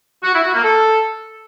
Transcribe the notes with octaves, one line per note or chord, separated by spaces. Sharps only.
F#4
E4
F#4
A#3
A4